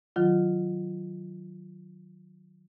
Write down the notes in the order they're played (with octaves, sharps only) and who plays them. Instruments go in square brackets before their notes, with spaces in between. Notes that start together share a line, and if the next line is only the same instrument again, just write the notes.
[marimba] D#3 F#3 F4